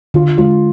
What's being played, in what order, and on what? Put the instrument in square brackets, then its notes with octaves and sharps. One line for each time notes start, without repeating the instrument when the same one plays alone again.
[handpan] D3 [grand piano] F4
[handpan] G#3 [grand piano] F4